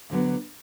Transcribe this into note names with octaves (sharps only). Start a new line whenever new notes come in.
D2 D3 F#3 B3